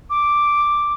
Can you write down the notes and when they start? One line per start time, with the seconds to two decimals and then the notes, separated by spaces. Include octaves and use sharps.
0.10 D6